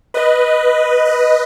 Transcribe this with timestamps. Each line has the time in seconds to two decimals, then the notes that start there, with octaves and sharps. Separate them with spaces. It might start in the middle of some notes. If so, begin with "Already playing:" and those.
0.14 B4 D#5
1.05 B4 D#5